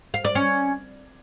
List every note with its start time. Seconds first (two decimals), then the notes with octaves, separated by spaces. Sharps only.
0.14 F5
0.25 D5
0.35 C#4